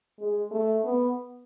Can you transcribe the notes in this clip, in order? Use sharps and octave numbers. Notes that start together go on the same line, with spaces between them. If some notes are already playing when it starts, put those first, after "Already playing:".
G#3
A3
B3